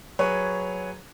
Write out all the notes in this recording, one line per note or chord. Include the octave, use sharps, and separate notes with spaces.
F#3 G#4 B4 C#5